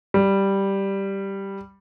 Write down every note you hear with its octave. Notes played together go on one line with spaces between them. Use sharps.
G3